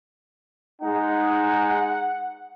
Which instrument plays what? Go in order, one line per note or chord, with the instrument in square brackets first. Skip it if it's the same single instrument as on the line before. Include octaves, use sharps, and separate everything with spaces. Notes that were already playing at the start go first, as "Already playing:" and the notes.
[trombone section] G#3 D#4 [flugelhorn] F#5